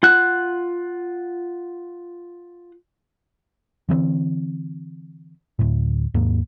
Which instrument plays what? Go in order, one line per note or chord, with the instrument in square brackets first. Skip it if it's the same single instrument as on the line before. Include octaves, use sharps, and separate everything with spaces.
[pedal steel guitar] F4 F#5 F#6
[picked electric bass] D3 E3 A#3 C4
D2 A2
D#2 G#2 A#3